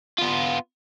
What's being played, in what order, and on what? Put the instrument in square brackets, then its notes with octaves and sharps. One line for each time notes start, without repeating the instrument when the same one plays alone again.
[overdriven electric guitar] B3 F4